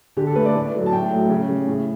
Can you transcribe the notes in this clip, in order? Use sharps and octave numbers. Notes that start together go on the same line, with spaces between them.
D3 G4
A4
A3 B4
D5
A2
F#3 A3
A5
A2 G5
F#3 A3
C#3
G3
A2